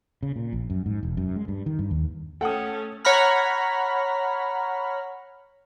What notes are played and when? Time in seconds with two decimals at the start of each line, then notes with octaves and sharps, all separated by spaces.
0.23 C#3
0.36 A#2
0.53 A#1
0.70 F#2
0.86 G#2
1.03 E1
1.17 F#2
1.36 G#3
1.48 G2
1.66 D#3
1.79 G2
1.91 D#2
2.41 A3 C#4 A4 F#5 G5 D#6
3.05 C#5 F#5 A#5 B5 F6